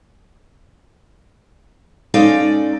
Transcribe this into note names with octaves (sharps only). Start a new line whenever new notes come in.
G#3 C#4 D#4 A4 D5 F5